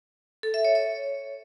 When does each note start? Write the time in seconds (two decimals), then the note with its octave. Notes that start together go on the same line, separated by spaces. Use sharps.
0.43 A4
0.54 E5
0.65 C#5
0.75 C#5